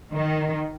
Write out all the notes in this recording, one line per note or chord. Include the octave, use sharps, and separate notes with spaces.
D#3